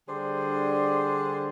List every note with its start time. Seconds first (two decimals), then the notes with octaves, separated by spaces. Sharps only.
0.07 D3 G3 D4 G#4 C5